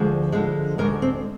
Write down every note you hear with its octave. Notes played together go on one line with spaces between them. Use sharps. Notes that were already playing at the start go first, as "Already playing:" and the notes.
Already playing: D2 D3 F3 G#3
D2 D3 F3 G#3
D2 D3 F3 G#3 A#4
C4